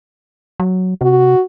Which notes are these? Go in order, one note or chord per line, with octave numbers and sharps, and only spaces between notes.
F#3
C3 F#4